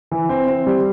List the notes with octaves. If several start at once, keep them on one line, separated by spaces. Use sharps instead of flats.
E3
C4
C4
G3